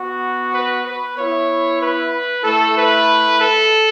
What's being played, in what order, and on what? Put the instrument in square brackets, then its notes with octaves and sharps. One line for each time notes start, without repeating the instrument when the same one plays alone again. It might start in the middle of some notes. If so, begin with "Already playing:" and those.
Already playing: [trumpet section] B3 F#4
B4
B4
B3 E4 C#5
B4
A3 E4 A4
B4
A4